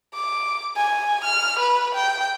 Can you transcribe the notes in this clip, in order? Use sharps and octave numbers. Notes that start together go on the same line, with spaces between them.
D6
G#5
F6
B4
G5